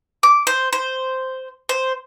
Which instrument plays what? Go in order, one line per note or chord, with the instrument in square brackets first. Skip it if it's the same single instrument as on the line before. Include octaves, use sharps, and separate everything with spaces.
[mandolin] D6
C5
C5
C5